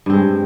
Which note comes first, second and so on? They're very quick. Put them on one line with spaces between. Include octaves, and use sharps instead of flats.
G2 C4 G#3